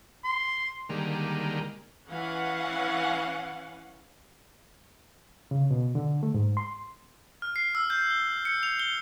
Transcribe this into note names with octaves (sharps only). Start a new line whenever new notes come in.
C6
D3 D#3 G3 G#3 A#3
E3 C#4 F5 F#5
C#3
B2
D3
A3
G#2
C6
F6
C7
E6
G6
G7
C#7
F7
G7